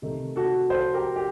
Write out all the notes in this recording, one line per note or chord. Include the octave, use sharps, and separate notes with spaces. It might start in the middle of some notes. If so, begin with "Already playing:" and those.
C3 D#3 A3
F#4 A4
A4 C5
G4 A#4
G4